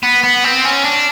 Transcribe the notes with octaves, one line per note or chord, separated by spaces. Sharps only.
B3
B3
C4
C#4
D4